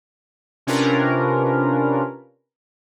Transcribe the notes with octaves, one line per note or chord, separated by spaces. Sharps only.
C3 C#4 D4 F4 A#4 B4